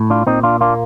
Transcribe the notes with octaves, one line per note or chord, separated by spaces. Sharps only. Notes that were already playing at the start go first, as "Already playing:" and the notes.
Already playing: A2
D4 F4
A#2 C4 D#4
D4 F4
A#3 D4 F4